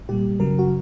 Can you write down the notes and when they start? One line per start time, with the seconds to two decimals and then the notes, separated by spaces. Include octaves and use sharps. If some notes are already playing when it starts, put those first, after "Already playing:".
0.09 A#2 G3 G4
0.40 F#2 C#3 F#3 A#4
0.59 F#4